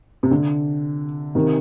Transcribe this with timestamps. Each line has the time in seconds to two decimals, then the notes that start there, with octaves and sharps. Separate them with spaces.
0.23 C3
0.31 D3
1.35 C3 D#3